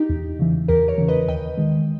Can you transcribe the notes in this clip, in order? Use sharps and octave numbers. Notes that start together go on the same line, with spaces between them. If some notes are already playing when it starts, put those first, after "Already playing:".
Already playing: D#4 G4
E2
C#3 E3
E2 G4 A#4
A#4 C#5
C#3 E3
B4 D#5
D#2 D#5 G5
D#3 G#3